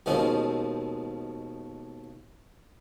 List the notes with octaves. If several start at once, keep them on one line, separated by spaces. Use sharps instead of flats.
D#2 B2 F3 G#3 C4 C#4